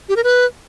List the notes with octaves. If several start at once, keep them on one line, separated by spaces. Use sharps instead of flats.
G4
A#4
B4